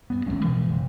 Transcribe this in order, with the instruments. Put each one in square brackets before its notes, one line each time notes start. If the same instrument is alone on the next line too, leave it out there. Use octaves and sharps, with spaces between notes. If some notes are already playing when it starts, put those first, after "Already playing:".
[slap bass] G2 B3
A1 D3 G#3 C#4
B2 E3 F3 G#3
F#1